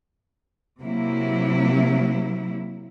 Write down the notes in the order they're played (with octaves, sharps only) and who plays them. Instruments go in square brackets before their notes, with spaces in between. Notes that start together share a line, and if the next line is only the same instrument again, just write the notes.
[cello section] C3 F#3 A#3 E4